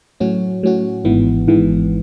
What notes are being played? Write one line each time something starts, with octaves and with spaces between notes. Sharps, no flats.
A2 F#3 C#4 F#4
A2 F#3 C#4 F#4
G#1 G#2 E3 B3
G#1 G#2 E3 B3